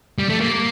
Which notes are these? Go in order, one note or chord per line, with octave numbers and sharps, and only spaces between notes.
G3
A3
A#3